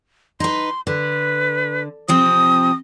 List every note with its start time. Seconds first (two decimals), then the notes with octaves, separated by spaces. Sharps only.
0.40 D#4 B4 C6
0.87 D3 B4
2.08 C3 F3 C4 D#6